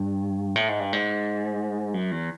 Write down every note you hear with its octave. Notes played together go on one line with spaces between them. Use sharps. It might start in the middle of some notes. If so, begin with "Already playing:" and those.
Already playing: G2
A2
G#2
G2
G#2
F#2
E2